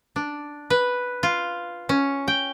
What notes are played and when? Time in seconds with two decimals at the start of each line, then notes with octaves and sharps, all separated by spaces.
0.16 D4
0.70 B4
1.23 F4
1.89 C#4
2.28 G5